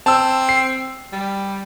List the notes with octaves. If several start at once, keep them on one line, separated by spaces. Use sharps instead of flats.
C4 A5 E6
C7
G3